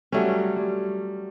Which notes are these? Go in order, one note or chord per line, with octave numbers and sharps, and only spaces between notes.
F#3 G3 A3 C#4
G3